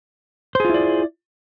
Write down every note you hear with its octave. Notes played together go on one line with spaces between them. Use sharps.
E4 F4 G#4 C5 D5